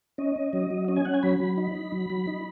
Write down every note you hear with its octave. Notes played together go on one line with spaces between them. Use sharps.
C#4 D#5
C#4
F#3
F#3
C#4 D#5
G#5
C#4 F#5
G#5
F#3 B5
F#3
D#4
D#4
F#3
F#3
D#4